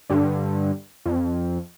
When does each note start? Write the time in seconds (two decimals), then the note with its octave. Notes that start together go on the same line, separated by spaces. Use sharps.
0.10 G2 D3
1.06 F2